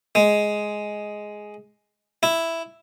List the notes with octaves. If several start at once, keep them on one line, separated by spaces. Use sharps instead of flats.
G#3
E4